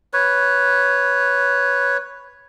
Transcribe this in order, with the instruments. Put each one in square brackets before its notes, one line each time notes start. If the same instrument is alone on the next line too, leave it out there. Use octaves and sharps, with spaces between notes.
[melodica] B4 C#5